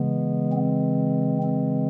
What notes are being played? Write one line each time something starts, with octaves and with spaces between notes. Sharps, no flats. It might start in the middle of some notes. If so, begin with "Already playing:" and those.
Already playing: C#3 E3 G#3 B3
C4
C4